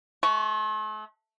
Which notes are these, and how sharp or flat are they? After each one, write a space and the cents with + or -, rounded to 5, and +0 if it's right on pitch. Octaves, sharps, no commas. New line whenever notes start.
A3 -40 C#6 +0